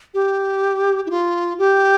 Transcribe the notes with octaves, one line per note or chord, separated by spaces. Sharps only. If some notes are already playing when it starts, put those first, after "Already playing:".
G4
E4
F4
G4